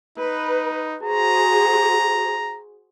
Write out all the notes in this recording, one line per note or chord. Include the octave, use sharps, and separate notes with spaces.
D#4 B4
F#4 G#4 C5 A#5